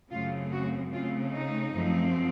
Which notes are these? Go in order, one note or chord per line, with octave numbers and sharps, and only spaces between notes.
F#2 C#3 A3 C4 F4
F#4
C#3 A3 C4 F4
D#4
F#2 F3 A3 C4